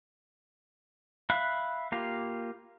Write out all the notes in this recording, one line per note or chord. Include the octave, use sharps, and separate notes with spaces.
E5 F5 B5 F#6
A#3 F4 G4 F5